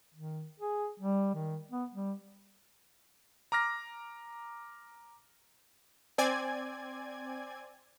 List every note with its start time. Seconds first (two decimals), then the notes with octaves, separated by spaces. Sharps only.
0.14 D#3
0.60 G#4
1.00 G3
1.34 D#3
1.71 B3
1.94 G3
3.52 A#5 D6 F6 A#6
6.18 C4 D5 G#5 G#6